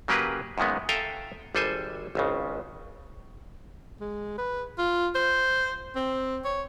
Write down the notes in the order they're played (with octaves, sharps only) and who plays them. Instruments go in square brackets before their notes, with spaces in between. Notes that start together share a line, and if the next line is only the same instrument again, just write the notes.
[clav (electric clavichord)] C#3 F#3 A#3 G4 G#4 B4
F#2 A#2 D#3 G#3 B3
A4 E5 F5 G5 G#5 A#5
G#1 G3 A4 C5 G#5
G#1 C#2 C#3
[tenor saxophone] G#3
B4
F4
C5
C4
C#5